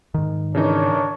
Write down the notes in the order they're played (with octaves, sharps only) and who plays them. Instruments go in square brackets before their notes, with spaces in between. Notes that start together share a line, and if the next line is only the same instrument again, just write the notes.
[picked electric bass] G#2 D#3
[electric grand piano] C#3 E3 D#4 [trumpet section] D4 A#4 C#5